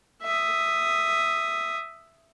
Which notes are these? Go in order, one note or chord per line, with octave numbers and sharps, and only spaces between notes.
E5 D#6